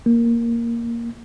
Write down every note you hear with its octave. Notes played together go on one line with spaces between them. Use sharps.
A#3